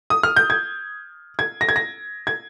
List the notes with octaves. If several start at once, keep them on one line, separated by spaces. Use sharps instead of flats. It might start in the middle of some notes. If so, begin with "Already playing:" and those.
D#6
F6
G6
G#6
G#6
A#6
G#6
A#6
G#6